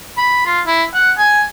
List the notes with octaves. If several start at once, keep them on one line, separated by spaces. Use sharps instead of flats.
B5
F4
E4
F#5
G#5